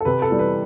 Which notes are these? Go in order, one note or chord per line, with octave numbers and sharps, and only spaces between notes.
A4
C3 B4
A4
E3 G3
B4